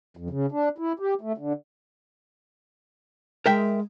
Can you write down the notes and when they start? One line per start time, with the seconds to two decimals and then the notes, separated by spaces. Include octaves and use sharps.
0.17 F2
0.30 C#3
0.52 D4
0.78 E4
0.99 G4
1.21 A3
1.38 D3
3.46 G#3 A#4 E5 G5